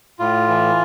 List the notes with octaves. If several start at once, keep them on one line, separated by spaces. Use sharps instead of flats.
A2 F4
E3